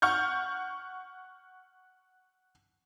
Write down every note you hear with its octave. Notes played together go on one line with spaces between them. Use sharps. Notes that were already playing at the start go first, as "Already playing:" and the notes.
F#5 C#6 F6 G6